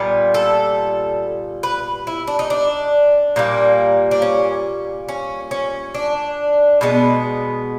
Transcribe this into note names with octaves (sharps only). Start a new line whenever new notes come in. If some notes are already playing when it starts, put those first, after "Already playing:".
Already playing: A#2 G3 B3
A4
B4
E4
D4
D#4
D4
A#2 G3 A#3
D4
C#4
C#4
C#4
D4
B2 G#3 B3